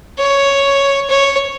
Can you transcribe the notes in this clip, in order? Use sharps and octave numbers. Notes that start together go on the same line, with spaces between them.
C#5
C#5